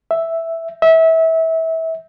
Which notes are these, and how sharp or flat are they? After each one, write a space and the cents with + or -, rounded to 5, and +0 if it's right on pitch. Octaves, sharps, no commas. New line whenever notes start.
E5 +0
E5 -25